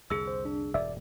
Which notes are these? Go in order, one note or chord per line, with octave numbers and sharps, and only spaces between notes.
C2 F2 D3 G#4 E6
C5
D4
E1 G2 D5 E5